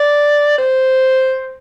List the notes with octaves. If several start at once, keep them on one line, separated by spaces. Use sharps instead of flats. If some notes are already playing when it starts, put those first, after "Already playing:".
Already playing: D5
C5